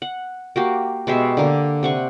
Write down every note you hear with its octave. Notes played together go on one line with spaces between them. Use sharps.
F#5
A#3 F#4 G4
B2 G#3 G4 E5
D3 A#3
C3 F#5 C#6